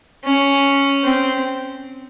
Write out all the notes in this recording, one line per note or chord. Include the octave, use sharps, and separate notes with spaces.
C#4
C4